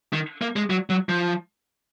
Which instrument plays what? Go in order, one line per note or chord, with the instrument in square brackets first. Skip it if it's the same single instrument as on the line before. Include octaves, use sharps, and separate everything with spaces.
[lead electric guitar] D#3
A#3
G#3
F#3
F#3
F3